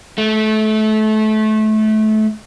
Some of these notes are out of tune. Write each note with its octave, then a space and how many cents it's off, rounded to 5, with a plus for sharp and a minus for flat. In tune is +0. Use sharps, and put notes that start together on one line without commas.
A3 -25